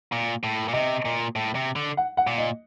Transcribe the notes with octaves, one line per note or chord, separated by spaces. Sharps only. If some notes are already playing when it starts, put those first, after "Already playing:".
A#2
A2
A#2
C3 D#5
A#2
A2
C3
D3
F#5
F#5
A#2
D#5